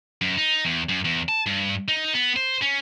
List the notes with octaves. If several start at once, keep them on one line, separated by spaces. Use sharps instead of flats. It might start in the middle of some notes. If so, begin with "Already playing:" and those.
F#2
D#4
E2
F#2
E2
A5
G2
D#4
B3
C5
C#4